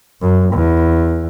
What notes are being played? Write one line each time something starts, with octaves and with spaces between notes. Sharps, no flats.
F#2
E2